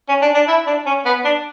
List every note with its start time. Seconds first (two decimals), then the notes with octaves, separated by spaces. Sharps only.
0.09 C#4
0.22 D4
0.35 D4
0.48 E4
0.67 D4
0.86 C#4
1.05 B3
1.25 D4